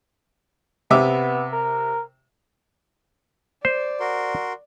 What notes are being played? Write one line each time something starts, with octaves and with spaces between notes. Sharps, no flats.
C3 B3 E5 D6
A#4
C5 D5
F#4 A#4 C6